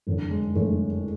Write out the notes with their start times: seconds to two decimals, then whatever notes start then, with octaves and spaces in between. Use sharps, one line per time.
0.07 F#1 F2 D3
0.31 G#3
0.55 F#1 F2 D3 A3